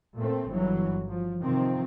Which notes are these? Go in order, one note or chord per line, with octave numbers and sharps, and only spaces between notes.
A#2 A3 C4
G1 E3 F#3
F3
C3 D#3 F3 C4